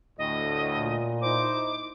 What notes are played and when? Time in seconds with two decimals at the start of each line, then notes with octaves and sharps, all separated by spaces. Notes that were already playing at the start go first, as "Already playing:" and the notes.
0.18 D2 A2 D#5
0.74 A#2
1.21 D#4 E4 C5 D6